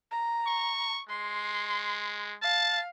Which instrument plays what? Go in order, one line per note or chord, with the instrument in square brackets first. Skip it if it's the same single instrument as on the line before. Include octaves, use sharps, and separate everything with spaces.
[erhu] A#5
[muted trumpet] C#6
[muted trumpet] G#3 [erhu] C6
[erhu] F5 [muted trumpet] A5